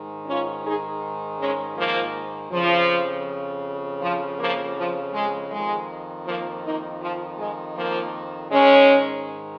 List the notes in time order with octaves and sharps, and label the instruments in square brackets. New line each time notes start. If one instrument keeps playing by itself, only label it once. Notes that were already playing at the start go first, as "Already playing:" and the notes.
Already playing: [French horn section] G#2 D#3
C#4 F4
D#4 G#4
G#3 C#4
F3 A#3
F2 C#3 F3
F3
F3 A#3
F3
G#3
F2 D#3 G#3
F3 A#3
A#3 D#4
F3
G#3
F3 A#3
G#2 D#3 G#3 C#4